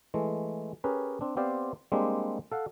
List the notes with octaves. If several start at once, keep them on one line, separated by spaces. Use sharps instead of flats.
E3 G#3 A3
C#4 G4 G#4 A#4 B4
C4 D4
B3 C4 G4 C5 D5 F5
G3 G#3 A#3 C4 D4 G4
A4 F5 F#5